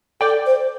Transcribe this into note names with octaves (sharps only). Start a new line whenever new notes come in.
A4 D5 G5
C5